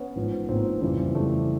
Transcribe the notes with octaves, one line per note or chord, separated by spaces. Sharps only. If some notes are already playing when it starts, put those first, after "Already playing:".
Already playing: B3 C#4
A1 G#2 F3
A1 G#2 F3 A#3 C4
F2 C#3 E3 G3
F2 C#3 E3 G3 A3